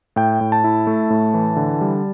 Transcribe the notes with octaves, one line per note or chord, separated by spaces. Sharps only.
A2 G5
A2
A5
E4
A3
A2
E3
D3
G3